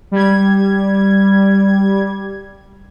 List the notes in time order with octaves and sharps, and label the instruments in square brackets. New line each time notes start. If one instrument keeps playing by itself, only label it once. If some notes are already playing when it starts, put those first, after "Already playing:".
[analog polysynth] G3 G#6